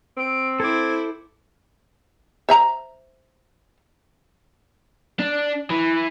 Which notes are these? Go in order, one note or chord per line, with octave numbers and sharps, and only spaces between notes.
C4 D7
E4 A4 C5 D6 G#6
C5 E5 A#5
D4
E3